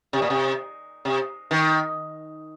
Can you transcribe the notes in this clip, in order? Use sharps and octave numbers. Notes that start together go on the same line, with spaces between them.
C3
A#2
C3
C3
D#3